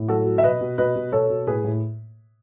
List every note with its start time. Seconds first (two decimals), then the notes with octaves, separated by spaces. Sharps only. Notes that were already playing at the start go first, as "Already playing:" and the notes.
Already playing: A2
0.08 F#3 F#4 A4
0.26 F#3
0.38 E5
0.43 B2 B4 D#5
0.61 B2
0.78 B2 B4 D#5
0.96 B2
1.12 B2 A4 C#5
1.30 B2
1.47 A2 G#4 B4
1.64 A2